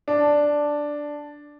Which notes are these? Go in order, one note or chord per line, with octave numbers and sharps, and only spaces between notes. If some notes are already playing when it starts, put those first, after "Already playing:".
D4